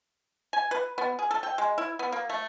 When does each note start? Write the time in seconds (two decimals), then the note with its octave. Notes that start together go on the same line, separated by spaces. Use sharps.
0.53 G#5
0.71 B4
0.98 B3
1.19 G#4
1.31 A4
1.43 G5
1.58 G#3
1.78 E4
1.99 B3
2.12 A#3
2.29 A3